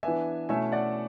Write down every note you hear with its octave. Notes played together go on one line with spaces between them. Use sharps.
E3 B3 D4 E5 G#5
B2 A3 C#4 E4 E5 G#5
D5 F#5